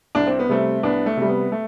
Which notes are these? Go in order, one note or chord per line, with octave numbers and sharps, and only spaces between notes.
C2 D4
C4
B3
C3 G3 A3 C4
C2 B3 D4
A3
C3 G3
B3
A3